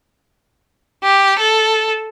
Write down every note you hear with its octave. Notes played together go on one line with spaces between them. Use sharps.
G4
A4